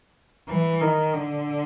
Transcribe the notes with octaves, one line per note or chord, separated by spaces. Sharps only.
E3
D#3
D3